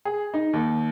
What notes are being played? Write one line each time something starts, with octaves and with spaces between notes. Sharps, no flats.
G#4
D#4
D#2